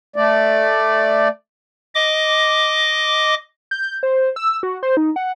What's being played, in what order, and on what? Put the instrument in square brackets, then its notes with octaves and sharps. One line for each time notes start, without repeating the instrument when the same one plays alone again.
[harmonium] A3 D5
[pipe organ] D#5 D6
[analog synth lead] G6
C5
E6
F#4
C5
D#4
F#5